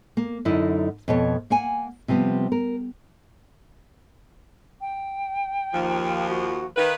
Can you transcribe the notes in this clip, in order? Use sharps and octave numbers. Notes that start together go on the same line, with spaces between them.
A#3
F#2 D3 D#4 E4 D#5
F2 B2 C#5
A#3 F#5 G#5
C3 F3 G3 B3
A#4
G5
D#2 F3
F#4
D#3 B4 F5